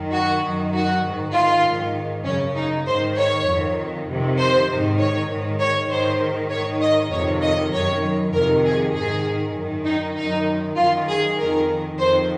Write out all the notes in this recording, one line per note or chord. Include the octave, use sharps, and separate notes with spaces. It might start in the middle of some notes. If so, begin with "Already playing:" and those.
Already playing: F#2 D#3
F#4
F#2 D#3
F#4
G#2 D#3
F4
G#2 D#3
F#2 C#3 C#4
D#4
G#2 D#3 C5
C#5
F2 D#3
F2 C3 D#3
C5
G#2 D#3
C#5
G#2 D#3
C#5
G#2 D#3 C5
G#2 D#3 C#5
D#5
F2 C3 D#3 C#5
D#5
F#2 D#3 C#5
F2 C3 D#3 A#4
G#4
G#2 D#3 G#4
F#2 D#3
D#4
F#2 D#3 D#4
F#2 D#3 F4
G#4
F2 D#3 A#4
F2 D#3 C5